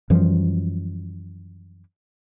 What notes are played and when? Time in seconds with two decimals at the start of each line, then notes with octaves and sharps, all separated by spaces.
0.10 F#2 E3 F3 G3